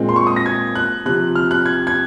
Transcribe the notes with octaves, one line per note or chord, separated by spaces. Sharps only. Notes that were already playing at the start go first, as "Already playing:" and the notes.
Already playing: A#2 G#3 C4
C6
C#6
D#6
A#6
G#6
F#6
C3 F3 C4 F#6
F6
F#6
G#6
G#6